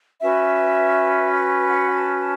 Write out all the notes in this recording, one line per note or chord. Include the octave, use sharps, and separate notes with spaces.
C#4 F#4 B4 E5
F#5
A5
A5